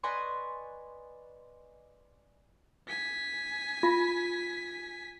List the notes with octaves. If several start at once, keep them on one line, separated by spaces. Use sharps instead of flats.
B4 D5 D#5 G#5 C6 C#6
G#5 B6
F4 B5